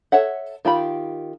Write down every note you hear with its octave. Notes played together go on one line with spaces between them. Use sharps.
A4 C#5 E5 F#5
D#3 F4 G4 B5